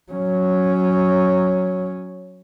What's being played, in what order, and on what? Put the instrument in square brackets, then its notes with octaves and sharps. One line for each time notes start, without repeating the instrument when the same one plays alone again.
[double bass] F#3 C#4